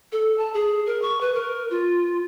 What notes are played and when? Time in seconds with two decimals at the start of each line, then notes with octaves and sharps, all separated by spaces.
0.12 A4
0.38 A5
0.54 G#4
0.86 A#4
1.02 C#6
1.21 B4
1.34 A#4
1.70 F4